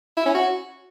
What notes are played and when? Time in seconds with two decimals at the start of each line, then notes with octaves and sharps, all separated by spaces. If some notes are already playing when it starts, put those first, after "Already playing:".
0.17 E4
0.26 C#4
0.35 F#4